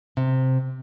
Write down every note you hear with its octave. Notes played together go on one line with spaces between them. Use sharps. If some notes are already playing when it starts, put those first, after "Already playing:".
C3